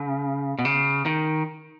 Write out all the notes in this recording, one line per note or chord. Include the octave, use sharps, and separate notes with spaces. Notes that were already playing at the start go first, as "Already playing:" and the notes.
Already playing: C#3
B2
C#3
D#3